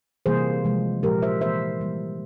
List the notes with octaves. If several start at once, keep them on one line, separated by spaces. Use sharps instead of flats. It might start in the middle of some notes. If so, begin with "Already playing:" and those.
C3 E3 G3 A#3 G#4 C5
C3 F3 G#3
A#2 F3 G#3 G4 A#4
C5 E5
E3 A#3 C5 E5
E3 G3 A#3